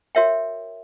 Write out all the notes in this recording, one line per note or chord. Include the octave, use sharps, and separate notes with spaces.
F#4 A#4 C#5 E5 G5